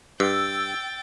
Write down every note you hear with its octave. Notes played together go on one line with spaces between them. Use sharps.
G2 G5 E6 A6